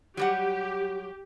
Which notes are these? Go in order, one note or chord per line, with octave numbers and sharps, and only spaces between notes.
F#3 G3 G4 F#5